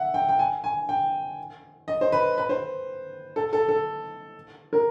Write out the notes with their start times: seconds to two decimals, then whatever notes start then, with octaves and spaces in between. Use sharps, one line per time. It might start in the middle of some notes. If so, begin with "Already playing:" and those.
Already playing: E5 F#5
0.14 G5
0.29 G5
0.39 G#5
0.64 G#5
0.89 G5
1.88 D#5
2.01 C5
2.12 B4
2.38 B4
2.49 C5
3.36 A4
3.53 A4
3.69 A4
4.73 A#4